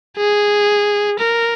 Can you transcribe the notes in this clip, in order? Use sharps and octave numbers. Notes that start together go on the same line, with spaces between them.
G#4
A#4